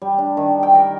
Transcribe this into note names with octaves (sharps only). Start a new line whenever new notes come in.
G3
D4
D#3
G5
A#4